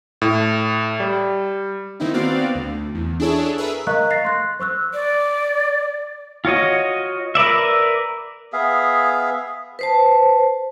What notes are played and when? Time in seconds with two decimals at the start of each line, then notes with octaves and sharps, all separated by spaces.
0.22 A2
1.00 G3
2.00 D#3 A#3 C4 D#4 E4
2.14 B3 C4 F#4 D5 F5
2.55 D2
2.95 E2
3.20 D4 E4 G#4 A4 C#5
3.58 G#4 A#4 B4 E5
3.87 A#4 D#5 F5 A#5 C#6 F#6
4.11 F5 A6 A#6 C7
4.25 C6 F#6
4.59 C5 C#6 E6 F#6
4.94 D5
6.45 F4 F#4 C#5 D#5
7.35 A#4 B4 D5 E5
8.53 B3 G#4 E5 F5
9.79 B4 C5 A5